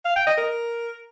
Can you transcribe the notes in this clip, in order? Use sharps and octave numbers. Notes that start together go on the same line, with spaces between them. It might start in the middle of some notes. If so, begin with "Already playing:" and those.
F5
G5
D#5
A#4